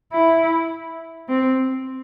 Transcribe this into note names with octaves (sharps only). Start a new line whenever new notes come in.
E4
C4